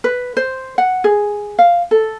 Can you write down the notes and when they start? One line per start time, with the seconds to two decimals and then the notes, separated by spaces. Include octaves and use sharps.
0.04 B4
0.37 C5
0.78 F#5
1.04 G#4
1.59 F5
1.91 A4